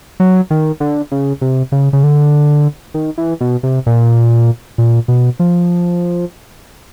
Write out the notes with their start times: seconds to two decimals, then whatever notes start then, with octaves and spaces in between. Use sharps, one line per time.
0.20 F#3
0.50 D#3
0.80 D3
1.12 C#3
1.41 C3
1.72 C#3
1.93 C#3
2.03 D3
2.94 D#3
3.18 E3
3.41 B2
3.63 C3
3.86 A#2
4.78 A#2
5.08 B2
5.40 F3